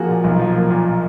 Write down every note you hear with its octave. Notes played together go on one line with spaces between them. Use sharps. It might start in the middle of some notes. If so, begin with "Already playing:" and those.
Already playing: F3 A#3 F#4 G#4
A#2
B1
F3
A#3
A#2